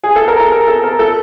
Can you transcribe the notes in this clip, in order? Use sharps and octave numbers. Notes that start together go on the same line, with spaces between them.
G#4
A4
A#4
A4
A#4
A4
A#4
A4